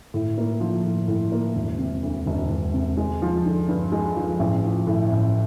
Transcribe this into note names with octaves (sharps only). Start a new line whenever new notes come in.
A2
A#3
F3
A2
A2
A#3
E1
C3
D2
E1
E1
C3
G#3
F3
D3
G2
G#3
F3
A1
F3
A2
A1